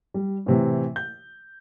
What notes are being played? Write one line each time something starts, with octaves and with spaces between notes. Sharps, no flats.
G3
A2 C3 E3
G6